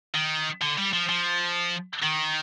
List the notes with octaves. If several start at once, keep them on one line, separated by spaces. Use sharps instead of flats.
D#3
D3
G3
F3
F3
D#3